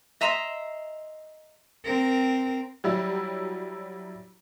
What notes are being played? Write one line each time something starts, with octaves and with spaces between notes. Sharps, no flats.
D#5 E5 A#5 C6
C4 A#4
F#3 G3 E4